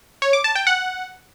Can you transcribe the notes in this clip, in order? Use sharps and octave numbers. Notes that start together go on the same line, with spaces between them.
C#5
D6
A5
G5
F#5